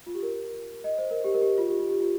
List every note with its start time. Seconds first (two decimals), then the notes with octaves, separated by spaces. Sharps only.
0.06 F4
0.15 G4
0.23 A#4
0.84 D#5
0.98 C5
1.11 A#4
1.24 G4
1.34 A#4
1.41 G4
1.58 F4
1.69 G4
1.79 F4
1.89 G4
2.00 F4